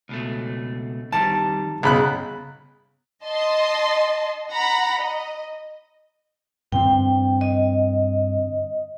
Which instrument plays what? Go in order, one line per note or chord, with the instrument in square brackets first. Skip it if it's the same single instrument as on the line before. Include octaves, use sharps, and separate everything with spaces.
[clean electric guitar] C#2 B2 A3
[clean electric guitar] F2 D#3 G3 [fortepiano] A5
[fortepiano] B1 B5 F#6 [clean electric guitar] G2 [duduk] C#3
[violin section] D#5 A5 C6
F#5 A#5 B5 A#6
D#5
[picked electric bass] G2 D3 C4 [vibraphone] G5
[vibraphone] D#5